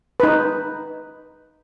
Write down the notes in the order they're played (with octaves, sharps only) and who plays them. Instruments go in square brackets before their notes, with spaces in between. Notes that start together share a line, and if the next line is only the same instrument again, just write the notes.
[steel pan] D#4 B4